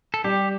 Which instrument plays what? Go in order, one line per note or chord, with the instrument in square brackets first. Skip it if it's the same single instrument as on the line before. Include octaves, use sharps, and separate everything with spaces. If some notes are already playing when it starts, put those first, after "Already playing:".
[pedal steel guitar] A4
[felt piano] G3 [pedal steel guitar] G4